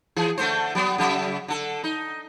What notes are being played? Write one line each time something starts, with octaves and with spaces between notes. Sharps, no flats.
E3 G#4
D3 A3 C5
F#3 B3
C#3 F#3 E5
D3 A4
D#4